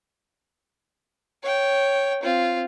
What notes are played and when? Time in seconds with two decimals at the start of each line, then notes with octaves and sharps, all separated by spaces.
1.42 C#5 G5
2.22 C4 F4